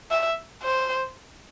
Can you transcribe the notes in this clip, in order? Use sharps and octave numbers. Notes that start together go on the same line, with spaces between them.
E5
C5